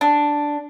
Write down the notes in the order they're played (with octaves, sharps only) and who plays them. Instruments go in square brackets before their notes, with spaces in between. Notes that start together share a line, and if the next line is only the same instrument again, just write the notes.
[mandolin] D4